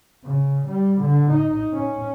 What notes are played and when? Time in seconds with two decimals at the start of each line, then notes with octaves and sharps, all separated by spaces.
0.24 C#3
0.66 G3
1.01 D3
1.31 D#4
1.73 C#4